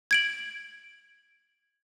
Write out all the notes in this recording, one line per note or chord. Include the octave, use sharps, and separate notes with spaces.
G#6 D7 F#7